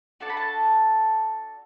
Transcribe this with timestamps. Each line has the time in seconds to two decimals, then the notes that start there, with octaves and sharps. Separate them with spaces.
0.20 D4 F#4 A4 A5
0.29 B5
0.37 A5